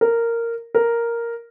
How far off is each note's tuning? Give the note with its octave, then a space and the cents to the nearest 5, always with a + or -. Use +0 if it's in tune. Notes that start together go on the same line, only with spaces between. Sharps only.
A#4 -10
A#4 +0